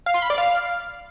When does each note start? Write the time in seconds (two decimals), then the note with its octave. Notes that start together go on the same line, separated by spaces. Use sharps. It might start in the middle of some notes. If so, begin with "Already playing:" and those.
0.06 F5
0.14 C6
0.22 B5
0.30 D5
0.38 F5